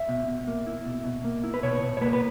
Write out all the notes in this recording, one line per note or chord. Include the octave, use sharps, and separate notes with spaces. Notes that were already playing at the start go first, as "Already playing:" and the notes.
Already playing: E5
B2
B2
A#3
E4
B2
B2
A#3
E4
B4
B2 C#5
B2
C#5
A#3 B4
B4